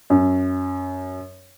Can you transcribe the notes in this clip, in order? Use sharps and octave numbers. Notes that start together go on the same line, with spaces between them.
F#2